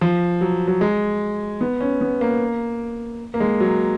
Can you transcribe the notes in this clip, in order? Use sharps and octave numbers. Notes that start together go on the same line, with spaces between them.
F3
F#3
F#3
G#3
B3
C#4
B3
A#3
A#3
G#3
F#3